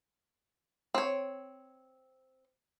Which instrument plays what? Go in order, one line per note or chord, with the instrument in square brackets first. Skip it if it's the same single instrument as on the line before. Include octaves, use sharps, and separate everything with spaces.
[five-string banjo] C4 C#5